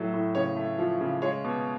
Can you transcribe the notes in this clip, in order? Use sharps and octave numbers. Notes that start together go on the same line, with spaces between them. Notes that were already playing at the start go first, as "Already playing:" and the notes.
Already playing: A2 F#3 A3
A2
C#3 C#5
A3
F3
C#3
G#3 C#5
B2